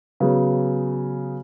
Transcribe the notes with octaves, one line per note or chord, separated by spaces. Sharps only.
C#3 F#3 B3